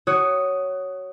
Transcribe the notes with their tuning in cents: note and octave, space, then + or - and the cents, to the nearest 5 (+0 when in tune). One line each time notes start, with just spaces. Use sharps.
F#4 +20 C#5 +0 D#6 +0